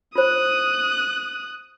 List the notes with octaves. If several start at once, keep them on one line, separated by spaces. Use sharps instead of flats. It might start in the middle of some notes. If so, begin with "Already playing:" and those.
F4 C5 D#6 F#6